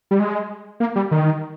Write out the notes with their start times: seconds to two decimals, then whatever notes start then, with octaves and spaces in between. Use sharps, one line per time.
0.11 G3
0.19 G#3
0.80 A#3
0.96 G3
1.11 D#3